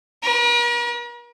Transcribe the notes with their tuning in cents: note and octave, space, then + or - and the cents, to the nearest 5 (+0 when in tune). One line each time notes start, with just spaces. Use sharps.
A#4 +45